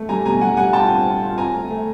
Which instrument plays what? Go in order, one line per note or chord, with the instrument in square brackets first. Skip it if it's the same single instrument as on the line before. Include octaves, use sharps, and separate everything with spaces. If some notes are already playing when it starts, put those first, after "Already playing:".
Already playing: [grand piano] A3
[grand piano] G3 [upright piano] G#5 A#5
[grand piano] B2 [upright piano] G#5 A#5
[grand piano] G3 [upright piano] F#5 G#5
[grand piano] G3 [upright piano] F#5 G#5
[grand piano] F4 [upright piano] G5 A5
[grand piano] C4
C4
F4
[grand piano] C4 [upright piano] G#5 A#5
[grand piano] A3
A3